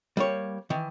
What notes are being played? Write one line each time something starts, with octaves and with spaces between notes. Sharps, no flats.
G3 A#3 C#5
D#3 E3